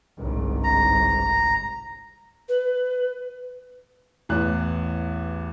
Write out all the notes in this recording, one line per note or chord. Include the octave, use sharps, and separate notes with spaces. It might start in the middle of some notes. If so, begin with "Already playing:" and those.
G1 C2 G#2
A#5
B4
A1 E2 F#6